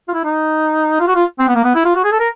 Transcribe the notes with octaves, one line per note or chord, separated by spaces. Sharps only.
F4
E4
D#4
F4
F#4
F4
C4
B3
A#3
B3
E4
F4
F#4
G#4
A4
A#4